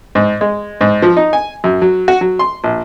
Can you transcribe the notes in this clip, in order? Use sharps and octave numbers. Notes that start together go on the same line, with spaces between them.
G#2
G#3
G#2
F3
D#4
G#5
F#2
F#3
F#4
F#3
C6
A#1